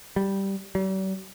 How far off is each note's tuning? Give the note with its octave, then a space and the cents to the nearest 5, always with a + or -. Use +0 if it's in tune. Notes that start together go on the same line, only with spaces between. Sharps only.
G3 -5
G3 -45